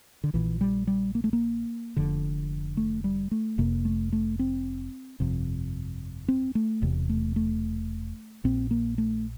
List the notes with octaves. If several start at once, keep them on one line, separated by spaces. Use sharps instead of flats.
D3
A#1 A#2 E3
G3
G3
A#3
A3
A#3
F1 F2 D3
A3
G3
A3
F1 F2 C3 A#3
A3
A3
C4
G1 F2 C3
C4
A3
E1 E2 C3
A3
A3
A#1 A#2 C4
A#3
A3